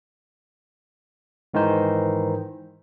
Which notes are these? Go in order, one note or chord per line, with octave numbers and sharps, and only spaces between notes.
G#2 D#3 E3 D#4 C5